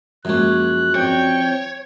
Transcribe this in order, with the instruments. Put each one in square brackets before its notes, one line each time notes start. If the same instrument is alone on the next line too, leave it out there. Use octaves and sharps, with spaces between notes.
[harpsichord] F#2 C#4 [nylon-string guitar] F3 G#3 A#3 [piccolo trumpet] F#6
[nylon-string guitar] F3 C4 D5 [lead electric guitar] C#5 [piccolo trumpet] G5